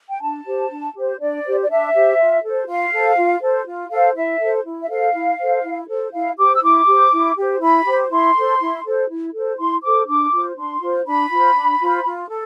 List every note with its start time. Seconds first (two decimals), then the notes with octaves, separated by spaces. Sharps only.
0.10 G5
0.21 D4 A5
0.46 G4 C5
0.70 D4
0.95 G4 C5
1.20 D4 D5
1.44 G4 C5
1.63 D5
1.69 D4 E5
1.94 G4 C5
2.18 F4
2.43 A4 C5
2.68 F4 F5
2.92 A4 C5
3.17 F4
3.42 A4 C5
3.66 F4
3.91 A4 C5 F5
4.16 E4 E5
4.41 A4 C5
4.65 E4
4.82 E5
4.90 A4 C5 F5
5.14 E4
5.39 A4 C5
5.64 E4
5.88 A4 C5
6.13 E4 F5
6.38 G4 C5 D6
6.54 E6
6.62 E4 D6
6.87 G4 C5
7.12 E4
7.36 G4 C5
7.61 E4 B5
7.85 G4 C5
8.10 E4 C6
8.35 A4 C5
8.60 E4
8.85 A4 C5
9.09 E4
9.34 A4 C5
9.58 E4 C6
9.83 A4 C5 D6
10.08 D4 D6
10.33 F4 C5
10.57 D4 C6
10.82 F4 C5
11.06 D4 B5
11.31 F4 C5
11.56 D4
11.80 F4 C5
12.05 F4
12.30 A4